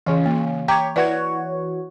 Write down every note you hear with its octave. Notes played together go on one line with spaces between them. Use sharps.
C#3 E3 C#4 F4
A#3
G4 C#5 A#5 D6
E3 F#4 B4 C#5 D5